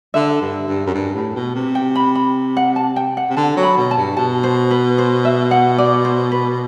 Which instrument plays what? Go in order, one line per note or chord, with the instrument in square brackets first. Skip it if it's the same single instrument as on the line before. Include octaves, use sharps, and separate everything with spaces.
[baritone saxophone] D3 [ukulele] E5
[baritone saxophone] G2
G2
F#2
G2
A2
B2
C3
[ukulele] G5
B5
B5
F#5
A5
G5
F#5
[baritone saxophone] C3
[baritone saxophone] D3 [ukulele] A5
[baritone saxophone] F#3
[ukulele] B5
[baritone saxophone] B2
[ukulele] A5
[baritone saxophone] G2
[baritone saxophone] B2 [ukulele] A5
[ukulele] C5
B4
C5
E5
F#5
D5
C5
B4